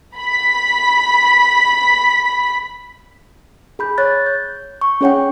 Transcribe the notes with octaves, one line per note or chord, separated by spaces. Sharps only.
B5 B6
G#4 B5 G6
C#5 F#6 A6
G6
C#6
C#4 G#4 C#5 F#5 G5